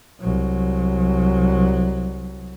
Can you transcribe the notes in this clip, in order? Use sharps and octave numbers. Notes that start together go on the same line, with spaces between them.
C2 F#3